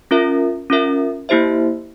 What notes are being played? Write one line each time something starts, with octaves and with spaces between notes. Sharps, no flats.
C#4 F4 A#4 E5
C#4 F4 A#4 E5
A#3 E4 G4 C5 E5